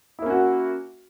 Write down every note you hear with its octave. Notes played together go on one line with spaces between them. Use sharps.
A#3 C#4 E4 F#4